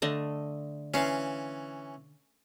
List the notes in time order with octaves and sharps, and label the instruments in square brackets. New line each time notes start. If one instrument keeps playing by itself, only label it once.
[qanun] D3 A3 D#5
[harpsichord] E3 C#4 [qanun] F5 C6